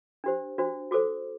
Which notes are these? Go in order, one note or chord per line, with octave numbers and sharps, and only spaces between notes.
D4 G4 C5
D4 F#4 C5
F#4 A4 C5 D6